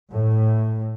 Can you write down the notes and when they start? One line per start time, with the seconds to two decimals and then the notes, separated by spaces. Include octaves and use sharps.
0.10 A2